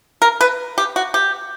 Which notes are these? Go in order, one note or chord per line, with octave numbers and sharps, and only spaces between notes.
A#4
B4
G4
F#4
G4